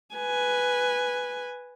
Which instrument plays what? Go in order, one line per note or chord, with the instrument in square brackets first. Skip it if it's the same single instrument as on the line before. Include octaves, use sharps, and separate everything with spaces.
[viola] B4 G#5